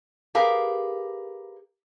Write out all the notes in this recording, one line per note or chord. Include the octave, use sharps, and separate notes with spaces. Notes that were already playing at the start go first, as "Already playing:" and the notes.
G4 G#4 A#4 B4 F5